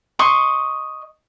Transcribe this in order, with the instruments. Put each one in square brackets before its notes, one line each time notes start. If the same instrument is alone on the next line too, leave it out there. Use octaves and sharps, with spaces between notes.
[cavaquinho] D#5 C6 C#6